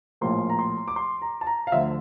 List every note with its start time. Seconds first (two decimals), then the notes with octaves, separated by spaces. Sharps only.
0.21 A#1 A2 F3 A#3 C6
0.50 A#5
0.59 C6
0.88 D6
0.96 C6
1.22 A#5
1.41 A5
1.47 A#5
1.67 F5
1.72 D2 D3 F3 E5